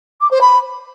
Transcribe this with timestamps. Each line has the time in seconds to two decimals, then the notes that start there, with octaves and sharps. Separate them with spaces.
0.20 D6
0.30 C5
0.40 B5